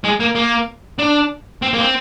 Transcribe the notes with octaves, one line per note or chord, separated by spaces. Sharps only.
G#3
A#3
A#3
D4
C4
A#3
C4